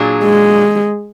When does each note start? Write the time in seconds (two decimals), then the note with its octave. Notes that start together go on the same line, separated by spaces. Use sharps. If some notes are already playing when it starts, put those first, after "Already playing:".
Already playing: A#2 F#3 D4 G#4
0.24 G#3